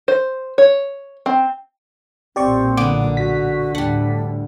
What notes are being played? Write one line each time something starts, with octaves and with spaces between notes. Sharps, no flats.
C5
C#5
C4
B1 A#2 C4 G4 D5 C#6
D3 B3 D6
F#4 B6
D2 A2 G3 D4 F#5